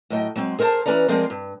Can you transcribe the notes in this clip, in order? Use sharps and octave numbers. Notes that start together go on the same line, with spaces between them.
A2 F#3 D#5 G5
F#3 G#3 C4
G#4 A#4 C5 E5 A5
E3 F3 C#4 B4 D5 A#5
F3 G#3 C4 G#4 A#4 D5
G2